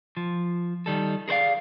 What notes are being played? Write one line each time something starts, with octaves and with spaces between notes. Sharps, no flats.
F3
D#3 G3 A4
G#4 A#4 C5 D5 F5